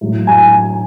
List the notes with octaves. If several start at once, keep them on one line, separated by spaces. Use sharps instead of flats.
A2 F#3
G#5